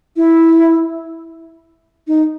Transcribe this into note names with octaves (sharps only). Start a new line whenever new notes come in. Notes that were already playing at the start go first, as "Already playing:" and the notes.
E4
D#4